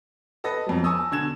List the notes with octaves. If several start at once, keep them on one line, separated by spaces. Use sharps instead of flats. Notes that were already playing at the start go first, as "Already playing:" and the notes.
A4 B4 D#5 A#6
F2 F#3
G#5 A5 C#6 D#6 E6
B2 D3 G#6 E7